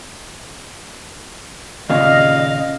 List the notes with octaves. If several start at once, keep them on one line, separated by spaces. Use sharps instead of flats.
D#2 A#2 C#3 D#5 F5